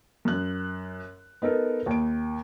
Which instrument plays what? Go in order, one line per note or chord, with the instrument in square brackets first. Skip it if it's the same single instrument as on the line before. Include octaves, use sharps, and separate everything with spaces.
[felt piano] F#2 F#6
B3 D#4 A4 A#4
D#2 D7